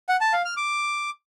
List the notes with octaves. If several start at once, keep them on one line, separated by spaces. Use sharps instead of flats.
F#5
A5
F5
F6
D6